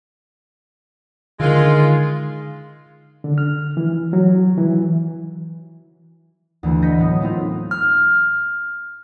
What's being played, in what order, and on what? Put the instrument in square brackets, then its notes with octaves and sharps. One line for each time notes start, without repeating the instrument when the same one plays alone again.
[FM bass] D3 [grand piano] D#3 [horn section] G#3 F4
[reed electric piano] D3
F6
E3
F#3
E3
[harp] D2 E3
D#5 G6 A#6 B6 C#7
A2 F#3 B3
G#3 A#3 C4 D#4 F4
[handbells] F6